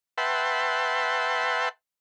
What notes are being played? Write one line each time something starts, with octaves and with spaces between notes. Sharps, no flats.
B4 E5 F#5 G5 A5 C6